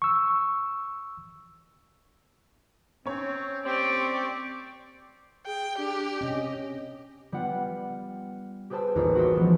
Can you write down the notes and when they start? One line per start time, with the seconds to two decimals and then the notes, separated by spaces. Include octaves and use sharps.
0.02 C#6 E6
3.06 C4 C#4 C#5
3.66 C4 G4 D5 C#6
5.47 G#4 G5
5.78 D4 G4
6.21 C3 C#4 D#5
7.32 G3 B3 F4 F#5
8.70 G4 G#4 B4 C5 A5 E6
8.95 A1 D#2 C#4 F4 D#6 E6
9.15 F#4 G4 A4 E5 C6 D#6
9.35 E3 F3 G#3 B3